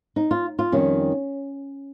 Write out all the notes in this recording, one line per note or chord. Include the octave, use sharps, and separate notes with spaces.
D#4
F4
F4
F2 D#3 G3 C#4